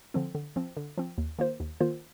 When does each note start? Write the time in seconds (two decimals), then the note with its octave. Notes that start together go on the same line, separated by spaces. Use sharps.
0.14 D3 F3 C4
0.35 D3
0.56 F3 C4
0.77 D3
0.97 F3 C4
1.18 D#2
1.39 D#3 A#3 F4 C5
1.60 D#2
1.80 D#3 A#3 F4 C5